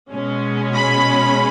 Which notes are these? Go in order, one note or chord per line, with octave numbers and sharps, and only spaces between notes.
B2 G#3 C#4
B5